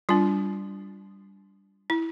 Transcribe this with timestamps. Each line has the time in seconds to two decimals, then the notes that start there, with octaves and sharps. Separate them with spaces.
0.09 G3 D4 F4
1.90 E4